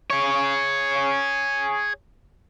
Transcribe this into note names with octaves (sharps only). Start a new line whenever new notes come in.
G#4 C#5